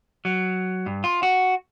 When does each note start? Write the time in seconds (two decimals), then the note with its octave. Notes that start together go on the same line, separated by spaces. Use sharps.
0.25 F#3
0.86 G2
1.04 F4
1.23 F#4